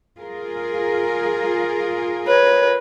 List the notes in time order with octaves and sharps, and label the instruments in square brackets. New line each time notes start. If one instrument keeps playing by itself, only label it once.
[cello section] F4 G#4 A#4
[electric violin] B4 [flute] C#5